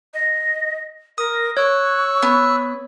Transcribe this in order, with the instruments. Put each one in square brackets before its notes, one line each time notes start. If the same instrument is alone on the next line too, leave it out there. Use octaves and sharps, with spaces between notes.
[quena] D#5
[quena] A#4 [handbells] D#6
[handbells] C#5 [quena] C#6 [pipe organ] E6 F#6
[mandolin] B3